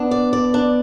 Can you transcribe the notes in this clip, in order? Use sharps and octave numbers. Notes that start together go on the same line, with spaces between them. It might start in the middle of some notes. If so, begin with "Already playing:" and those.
Already playing: B3 D4
D5
D5
D4